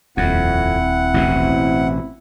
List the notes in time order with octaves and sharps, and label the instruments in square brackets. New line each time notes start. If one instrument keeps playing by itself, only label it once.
[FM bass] D#1 [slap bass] F2 [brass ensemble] C4 E4 [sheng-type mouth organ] F#5
[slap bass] A1 B2